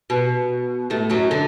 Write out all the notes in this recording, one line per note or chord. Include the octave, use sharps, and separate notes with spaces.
B2
A2 A3
F#2 F#3
D3